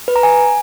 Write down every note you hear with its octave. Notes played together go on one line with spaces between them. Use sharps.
B4
A#5
G#5